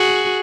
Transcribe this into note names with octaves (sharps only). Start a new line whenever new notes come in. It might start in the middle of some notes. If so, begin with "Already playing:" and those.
Already playing: F#4 G#4